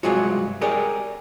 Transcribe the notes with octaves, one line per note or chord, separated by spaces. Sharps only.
G2 C3 F#3 G#3 F4 F#4
G4 G#4 A#4 C#5 D5